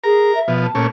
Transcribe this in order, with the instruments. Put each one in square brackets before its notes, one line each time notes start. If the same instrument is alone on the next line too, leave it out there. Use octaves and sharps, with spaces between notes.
[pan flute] G#4 [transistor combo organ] A#4 A#5
[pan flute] E5
[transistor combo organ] B2 F3
[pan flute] A5
[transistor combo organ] A#2 A3 C#4